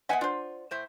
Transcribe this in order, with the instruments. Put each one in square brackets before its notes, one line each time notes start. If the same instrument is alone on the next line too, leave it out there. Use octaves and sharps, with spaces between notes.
[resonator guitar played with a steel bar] B3 B4 F#5 [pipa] D#5 E5 G#5
[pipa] D4 C5 [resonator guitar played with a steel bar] F4
[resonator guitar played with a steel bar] A2 C5 E5